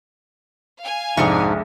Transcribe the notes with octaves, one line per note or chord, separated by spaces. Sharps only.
F5 G#5
C2 F2 G#2 G#3 D4 C#6